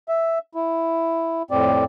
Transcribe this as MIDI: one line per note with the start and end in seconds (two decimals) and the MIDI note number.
0.09 0.39 76
0.55 1.42 64
1.51 1.84 41
1.51 1.84 45
1.51 1.84 60
1.51 1.84 74